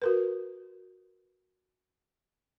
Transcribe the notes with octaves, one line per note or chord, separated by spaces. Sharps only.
F#4 A#4 B4